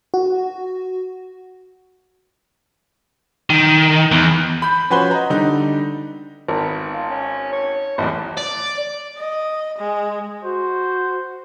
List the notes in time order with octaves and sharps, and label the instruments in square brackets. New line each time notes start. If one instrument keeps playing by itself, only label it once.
[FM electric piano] F#4
[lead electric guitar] D#3
E2
[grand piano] B5 G6
F3 C#4 F#4 B4 C5 G7
D#5 A#5
D3 G3 D#4
[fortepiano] G#1 A#4 [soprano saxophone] B3
[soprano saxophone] F4
C#4
C#5
[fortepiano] A1 E2 [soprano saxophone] D#5
[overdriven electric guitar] D5
[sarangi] D#5
G#3
[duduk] F#4 [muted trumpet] C5